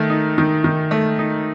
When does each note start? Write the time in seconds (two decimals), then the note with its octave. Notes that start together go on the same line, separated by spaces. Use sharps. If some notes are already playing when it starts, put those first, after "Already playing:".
Already playing: D#3 A3
0.10 D#4
0.38 D#3
0.64 D#3
0.91 A3
1.19 D#4